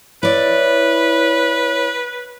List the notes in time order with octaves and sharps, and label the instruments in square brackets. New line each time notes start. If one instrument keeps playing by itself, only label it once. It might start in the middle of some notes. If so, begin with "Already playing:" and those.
[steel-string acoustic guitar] E4 D5 [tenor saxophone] B4 [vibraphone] C#5